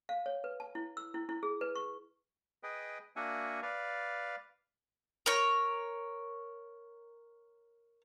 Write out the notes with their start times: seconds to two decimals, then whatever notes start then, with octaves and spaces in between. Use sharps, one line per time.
0.09 F5
0.26 C#5
0.44 B4
0.60 A5
0.75 E4
0.97 E6
1.14 E4
1.29 E4
1.43 G#4
1.61 B4
1.76 C#6
2.63 G#4 B4 D#5 G5
3.16 A#3 D4 F#4 E5 F#5 G#5
3.62 B4 D5 F5
5.26 A#4 C#5